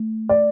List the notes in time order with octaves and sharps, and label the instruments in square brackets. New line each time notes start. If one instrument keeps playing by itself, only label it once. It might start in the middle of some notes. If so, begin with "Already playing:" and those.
Already playing: [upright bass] A3
[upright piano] D5